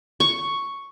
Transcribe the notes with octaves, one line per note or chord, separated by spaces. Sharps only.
C#6